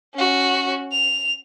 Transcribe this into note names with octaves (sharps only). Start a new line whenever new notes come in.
C#4 F#4
F7